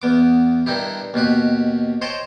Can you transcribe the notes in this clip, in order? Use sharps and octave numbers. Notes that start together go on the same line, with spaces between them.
E2 B3 D6
G2 D#3 D#4 E4 G4
D#2 B2 G4 B4
C5 C#5 D#5 G5 A5